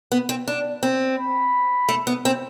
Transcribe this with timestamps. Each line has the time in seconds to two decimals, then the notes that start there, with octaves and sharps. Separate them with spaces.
0.12 B3
0.29 C4
0.48 D4
0.83 C4
1.18 B5
1.89 A3
2.07 B3
2.25 C4